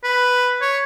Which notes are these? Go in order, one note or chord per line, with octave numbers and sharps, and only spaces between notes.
B4
C#5